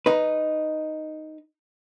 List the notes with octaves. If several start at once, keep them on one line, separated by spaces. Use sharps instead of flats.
D#4 B4